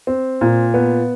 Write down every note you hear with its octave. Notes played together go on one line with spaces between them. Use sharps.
C4
A#2
B3